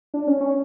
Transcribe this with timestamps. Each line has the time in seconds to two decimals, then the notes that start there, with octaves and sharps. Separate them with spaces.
0.14 D4
0.27 C#4
0.41 C#4